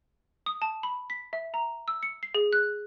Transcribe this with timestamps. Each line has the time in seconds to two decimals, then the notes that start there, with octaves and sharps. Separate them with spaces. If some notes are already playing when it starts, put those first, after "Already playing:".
0.46 D#6
0.62 A5
0.83 B5
1.10 B6
1.33 E5
1.54 A#5
1.88 E6
2.03 C#7
2.23 C7
2.35 G#4
2.53 F#6